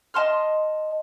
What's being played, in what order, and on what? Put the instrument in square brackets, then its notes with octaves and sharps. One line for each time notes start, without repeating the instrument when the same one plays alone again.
[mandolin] D#5 A5 C6 F6